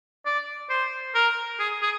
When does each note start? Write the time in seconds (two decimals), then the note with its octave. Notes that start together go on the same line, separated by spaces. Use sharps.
0.25 D5
0.70 C5
1.15 A#4
1.59 G#4
1.82 G#4